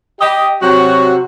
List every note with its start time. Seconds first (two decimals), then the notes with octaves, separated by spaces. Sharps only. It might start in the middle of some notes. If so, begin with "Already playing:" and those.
0.20 G4 D#5
0.62 C3 F#3 F#4